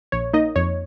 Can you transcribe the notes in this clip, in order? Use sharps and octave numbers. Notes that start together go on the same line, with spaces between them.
A#1 C#5
A#3 D#4 D#5
F2 C#5